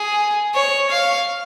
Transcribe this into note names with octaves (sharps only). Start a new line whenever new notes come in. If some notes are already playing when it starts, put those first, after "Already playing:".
Already playing: G#4
C#5
F5